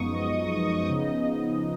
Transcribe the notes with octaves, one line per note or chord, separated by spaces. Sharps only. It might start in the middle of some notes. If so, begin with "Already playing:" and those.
Already playing: F#2 F3 G#3 B3 D#4 C#6 D#6
D#5
C#3 F3 B3 D#4